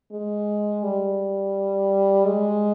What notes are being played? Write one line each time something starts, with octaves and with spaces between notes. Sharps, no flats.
G#3
G3
G#3